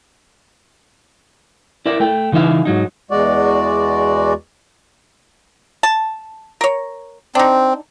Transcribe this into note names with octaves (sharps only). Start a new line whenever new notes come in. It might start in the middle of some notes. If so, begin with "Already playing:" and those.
E4 A#4 D5 E5
A3 G5
C#3 E3 D#4 E5 F5
G#2 F#3 D#4
E2 G#3 F#4 D5
A5
A#4 C#5
C4 D4 D#4